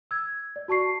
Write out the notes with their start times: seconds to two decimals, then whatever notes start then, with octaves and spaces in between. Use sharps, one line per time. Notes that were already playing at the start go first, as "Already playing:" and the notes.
0.11 E6 G#6
0.56 D5
0.68 F#4 A5 C#6 C7